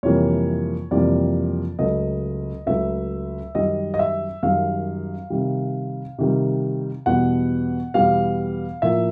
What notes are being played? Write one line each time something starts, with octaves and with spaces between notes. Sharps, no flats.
F2 C3 E3 G3 A#3 C#5
F2 C3 E3 G3 A#3 D5
C#2 C#3 F#3 A3 D#5
C#2 C#3 F#3 A3 E5
F#2 D#3 G3 D#5
D#5
E5
F#2 D#3 G3 F5
C3 D#3 G3
C3 D#3 G3
E2 B2 G3 B3 F#5
E2 B2 G3 B3 F5
A2 F3 A#3 E5